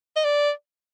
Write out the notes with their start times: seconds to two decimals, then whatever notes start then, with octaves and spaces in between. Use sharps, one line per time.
0.16 D#5
0.24 D5